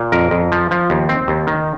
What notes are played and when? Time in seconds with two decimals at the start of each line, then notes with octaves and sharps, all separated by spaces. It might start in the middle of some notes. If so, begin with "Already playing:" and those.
Already playing: A#2
0.12 F2 A#4
0.31 F2
0.52 F3
0.71 F3
0.90 D#2
1.09 C4
1.28 D#2
1.47 D#3